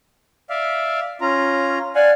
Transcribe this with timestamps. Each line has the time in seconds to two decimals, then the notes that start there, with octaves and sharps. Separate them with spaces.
0.50 D5 E5 F5
1.21 C#4 F4 A#5
1.95 D5 F5 F#5 G#5